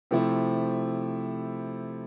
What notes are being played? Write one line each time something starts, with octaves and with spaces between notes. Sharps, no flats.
C3 F3 A3 C4 E4